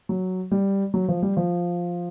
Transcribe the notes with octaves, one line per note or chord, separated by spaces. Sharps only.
F#3
G3
F#3
F3
G3
F3